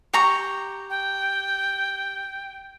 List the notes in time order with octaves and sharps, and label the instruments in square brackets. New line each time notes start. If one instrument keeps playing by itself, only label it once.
[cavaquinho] G4 A#5 C#6
[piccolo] G5